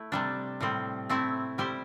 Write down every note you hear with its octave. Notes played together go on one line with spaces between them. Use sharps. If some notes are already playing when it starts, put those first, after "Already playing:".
Already playing: A3 E4
C3 G3 D4
A2 G3 C4
A3 C4 E4
G3 E4 G4 C5